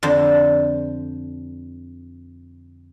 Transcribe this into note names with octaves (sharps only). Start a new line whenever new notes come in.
F2 D3 C5